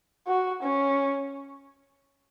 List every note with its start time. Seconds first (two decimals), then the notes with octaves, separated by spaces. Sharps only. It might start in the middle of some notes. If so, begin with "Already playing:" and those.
0.27 F#4
0.63 C#4